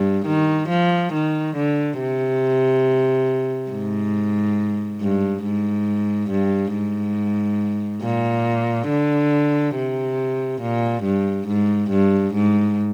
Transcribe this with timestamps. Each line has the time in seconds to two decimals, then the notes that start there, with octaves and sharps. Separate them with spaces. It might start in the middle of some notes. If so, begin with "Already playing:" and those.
Already playing: G2
0.26 D#3
0.69 F3
1.13 D#3
1.56 D3
1.99 C3
3.71 G#2
5.01 G2
5.44 G#2
6.30 G2
6.74 G#2
8.02 A#2
8.89 D3
9.76 C3
10.61 A#2
11.04 G2
11.48 G#2
11.90 G2
12.34 G#2